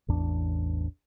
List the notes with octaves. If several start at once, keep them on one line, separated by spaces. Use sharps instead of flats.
A1 E2 D4